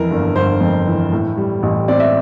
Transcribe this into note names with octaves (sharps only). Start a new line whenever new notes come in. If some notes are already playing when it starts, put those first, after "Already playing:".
Already playing: F2 E3 A#4
G1
G1 C5
F2
E3
A2
G3
A1
C4 D5
E5